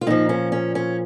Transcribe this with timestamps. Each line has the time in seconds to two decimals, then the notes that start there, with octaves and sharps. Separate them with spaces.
0.01 F4
0.07 A#2 F3 D#4
0.29 C#4
0.52 C#4
0.75 C#4